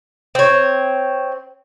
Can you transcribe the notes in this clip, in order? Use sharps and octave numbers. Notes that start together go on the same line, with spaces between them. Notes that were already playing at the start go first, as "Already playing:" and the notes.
C4 C#5